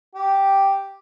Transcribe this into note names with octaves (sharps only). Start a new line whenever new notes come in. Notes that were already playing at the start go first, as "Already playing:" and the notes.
G4